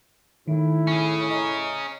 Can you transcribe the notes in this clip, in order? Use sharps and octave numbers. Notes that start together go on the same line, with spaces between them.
A2 D#3 E4
C#4 G#4
D#5 A#5